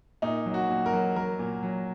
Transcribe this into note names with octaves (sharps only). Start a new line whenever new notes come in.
A#2 D#4
F#3
F#4
A#2
A#4
F#3
F#3 A#4
A#2
F#3